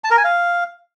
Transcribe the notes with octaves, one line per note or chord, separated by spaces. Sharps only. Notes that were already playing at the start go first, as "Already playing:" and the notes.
A5
A#4
G#5
F5